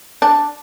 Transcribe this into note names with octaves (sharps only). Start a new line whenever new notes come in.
D4